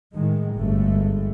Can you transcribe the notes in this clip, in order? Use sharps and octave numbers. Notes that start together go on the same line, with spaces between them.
A2 D#3 G#3
G1 F#2 G#3 A3